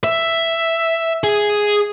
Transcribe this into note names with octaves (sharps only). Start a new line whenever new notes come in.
E5
G#4